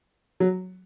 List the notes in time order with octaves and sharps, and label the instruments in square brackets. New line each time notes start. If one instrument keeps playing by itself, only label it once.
[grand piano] F#3